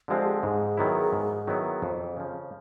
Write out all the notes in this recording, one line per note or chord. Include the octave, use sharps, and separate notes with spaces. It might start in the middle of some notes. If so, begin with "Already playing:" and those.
D3 F3 G#3 C4 G4
G4
G#4
G#2 G#4
D#3 F#3 B3 E4
G#2
D#3 F#3 B3 E4
F2
C#3 F3